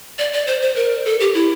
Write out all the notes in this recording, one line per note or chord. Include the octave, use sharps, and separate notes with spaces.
D5
D5
C5
C5
A#4
A4
G4
E4